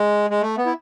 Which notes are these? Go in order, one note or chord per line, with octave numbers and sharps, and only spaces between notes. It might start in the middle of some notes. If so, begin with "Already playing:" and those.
Already playing: G#3
G#3
A3
B3
E4